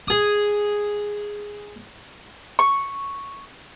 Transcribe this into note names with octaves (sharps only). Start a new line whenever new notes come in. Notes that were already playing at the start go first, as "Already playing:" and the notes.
G#4 D#6
C#6